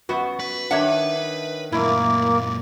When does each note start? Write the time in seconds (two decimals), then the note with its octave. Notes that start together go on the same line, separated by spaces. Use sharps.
0.09 F#2 B3 F#4
0.40 B4
0.71 D#3 D4 C#5 E5 F#5
1.72 F#2 A#2 A3 A#3 E4